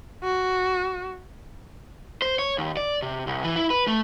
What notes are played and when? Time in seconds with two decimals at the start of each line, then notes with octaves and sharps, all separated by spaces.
0.23 F#4
2.22 C5
2.39 C#5
2.58 D#2
2.77 D5
3.02 C3
3.27 C2
3.44 E3
3.56 E4
3.70 B4
3.88 A3